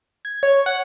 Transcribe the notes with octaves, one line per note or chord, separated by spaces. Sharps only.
G#6
C#5
F#5